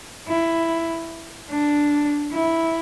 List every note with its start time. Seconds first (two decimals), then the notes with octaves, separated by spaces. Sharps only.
0.28 E4
1.50 D4
2.32 E4